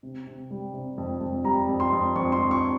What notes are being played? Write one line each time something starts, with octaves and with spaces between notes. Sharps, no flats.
C3
C3
G3
C3
F2
F2
G3 A#5
F2
C6
F2
F2 C#6
C6
F2
C#6